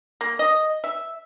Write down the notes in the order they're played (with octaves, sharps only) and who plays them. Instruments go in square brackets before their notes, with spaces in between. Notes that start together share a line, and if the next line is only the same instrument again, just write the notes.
[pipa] A#3
D#5
E5